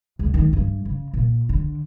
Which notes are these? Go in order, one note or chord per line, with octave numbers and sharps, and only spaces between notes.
C#2
D#3
G2
C#3
A#2
D3